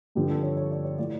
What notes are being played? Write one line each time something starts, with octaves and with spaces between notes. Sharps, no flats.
G2 D3 F3 G4
A4
C#5
C#5
D5
C#5
A2 F3 D5